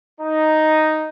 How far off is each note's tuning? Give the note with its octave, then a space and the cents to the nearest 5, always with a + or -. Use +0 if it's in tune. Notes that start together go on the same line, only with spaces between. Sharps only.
D#4 +0